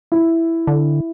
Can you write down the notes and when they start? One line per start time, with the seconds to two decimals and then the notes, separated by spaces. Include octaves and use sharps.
0.12 E4
0.67 D3